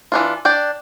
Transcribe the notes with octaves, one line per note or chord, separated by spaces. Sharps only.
E3 D4 F4
D4 D5 G5